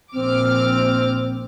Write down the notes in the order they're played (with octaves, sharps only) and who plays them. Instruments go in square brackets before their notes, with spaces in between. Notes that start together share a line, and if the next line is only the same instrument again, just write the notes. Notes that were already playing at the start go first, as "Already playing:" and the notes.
[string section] A#1 D6 F6 [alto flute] C4